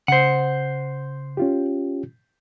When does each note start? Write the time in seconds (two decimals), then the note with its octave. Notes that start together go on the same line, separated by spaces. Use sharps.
0.08 C#3 C5 F#5
1.37 C#4 F4 G4